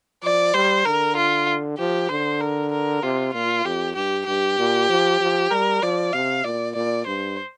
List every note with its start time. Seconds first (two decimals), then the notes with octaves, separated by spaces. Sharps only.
0.23 F3 D5
0.54 G3 C5
0.85 D3 A#4
1.17 F4
1.78 F3 G4
2.09 D3 C5
2.41 A#4
2.72 A#4
3.03 C3 F4
3.34 A#2 F4
3.65 F2 G4
3.96 G2 G4
4.27 G2 G4
4.58 A#2
4.89 F3
5.20 F3
5.51 G3 A#4
5.83 F3 D5
6.13 C3 F5
6.44 A#2 D5
6.76 A#2 D5
7.06 G2 C5